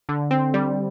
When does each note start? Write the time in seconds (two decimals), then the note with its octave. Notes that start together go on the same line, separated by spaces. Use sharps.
0.09 D3
0.31 C4
0.54 G3